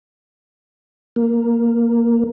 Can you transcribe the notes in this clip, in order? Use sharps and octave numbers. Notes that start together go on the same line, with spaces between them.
A#3